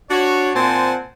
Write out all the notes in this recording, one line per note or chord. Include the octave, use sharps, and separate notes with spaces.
D4 F#4 C#5
A#2 C4 C5 F#5 G#5 A5